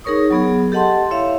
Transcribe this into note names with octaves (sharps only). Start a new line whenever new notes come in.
D#4 G#4 A#4 C#5 C#6 D#6
F#3 B3 G#4
G4 A4 D#5 F#5 A5 C6
E4 C#5 E5 F5